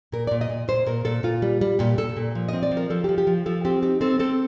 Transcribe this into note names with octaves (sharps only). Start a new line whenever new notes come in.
A#2 A#4
A#2 D5
D#5
A#2
A#2 C5
A#2 A#4
A#2 A4
A#2 F4
G3
G3
A#2 G4
A#2 A4
A#2
F3
C4 D#5
D5
F3
A#4
F3 A4
G4
F3
G4
F3
F3 A4
C4 G4
D#4 G4
C4 A4
C4 A4